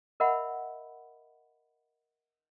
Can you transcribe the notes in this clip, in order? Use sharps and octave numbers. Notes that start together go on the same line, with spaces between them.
A#4 D#5 E5 F#5 B5